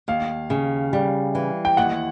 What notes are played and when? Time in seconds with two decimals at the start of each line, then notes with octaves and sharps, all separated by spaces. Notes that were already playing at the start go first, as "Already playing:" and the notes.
0.08 D#2 F5
0.50 C#3
0.93 G3
1.35 E3
1.65 G5
1.77 D#2 F#5